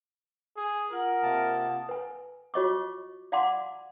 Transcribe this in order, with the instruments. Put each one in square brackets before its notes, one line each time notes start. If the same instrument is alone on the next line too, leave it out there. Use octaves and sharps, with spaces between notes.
[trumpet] G#4
[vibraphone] F4 F#5 D#6 [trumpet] A#4
[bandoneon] C3 A#3 A5
[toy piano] B4 G#5
F4 F#4 C#5 D#5 C#6 D6
D5 F5 F#5 A5 C6 D6